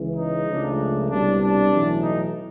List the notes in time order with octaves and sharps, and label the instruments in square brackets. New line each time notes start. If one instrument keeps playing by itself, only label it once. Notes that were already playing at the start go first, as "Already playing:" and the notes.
Already playing: [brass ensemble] C#2 C#3 E3
D#4
C#2 C#3 F3 A3 D4
C2 B2 G3 D4
D4
B1 A2 E3
D#4